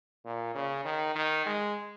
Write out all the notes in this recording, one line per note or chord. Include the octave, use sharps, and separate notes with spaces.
A#2
C#3
D#3
D#3
G#3